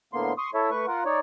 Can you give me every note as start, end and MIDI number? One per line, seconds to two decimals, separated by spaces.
0.13 0.33 45
0.13 0.33 50
0.13 0.33 58
0.13 0.33 59
0.13 0.33 84
0.38 0.50 84
0.38 0.50 85
0.38 0.50 87
0.54 0.70 64
0.54 0.70 69
0.54 0.70 73
0.54 0.70 76
0.71 0.86 57
0.71 0.86 71
0.71 0.86 85
0.88 1.04 65
0.88 1.04 70
0.88 1.04 78
1.05 1.20 63
1.05 1.20 73
1.05 1.20 74